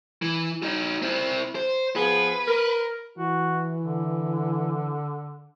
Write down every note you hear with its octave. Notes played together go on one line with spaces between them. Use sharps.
E3
D#4 F#4
C4 E4
C5
F3 B3 G#4 B4
A#4
E3 F#4
D3